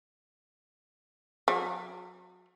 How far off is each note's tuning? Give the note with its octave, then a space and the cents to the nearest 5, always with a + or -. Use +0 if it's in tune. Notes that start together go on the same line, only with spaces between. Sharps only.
F#3 -30